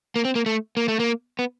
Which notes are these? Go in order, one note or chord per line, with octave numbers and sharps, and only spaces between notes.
A#3
C4
A#3
A3
A#3
A3
A#3
B3